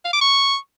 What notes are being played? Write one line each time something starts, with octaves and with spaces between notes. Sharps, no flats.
F5
D6
C#6